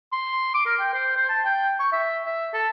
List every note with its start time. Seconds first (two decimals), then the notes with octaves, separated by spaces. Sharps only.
0.12 C6
0.54 D6
0.66 A#4
0.79 G5
0.93 C5
1.16 C5
1.29 A5
1.45 G5
1.79 C#6
1.93 E5
2.25 E5
2.54 A4